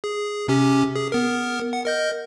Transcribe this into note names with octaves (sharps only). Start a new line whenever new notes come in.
G#4
C3 C#4 G4
G#4
B3 A#4
F#5
A#4 D#5 G6